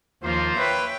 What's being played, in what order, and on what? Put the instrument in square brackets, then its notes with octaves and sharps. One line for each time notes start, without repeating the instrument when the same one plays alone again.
[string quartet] D#2 F3 [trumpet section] A#3 F4 C5
[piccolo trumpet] B4 [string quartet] C#5 E5 G5